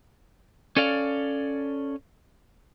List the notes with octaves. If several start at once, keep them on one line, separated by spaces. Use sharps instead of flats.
C#4 A4 D5 F5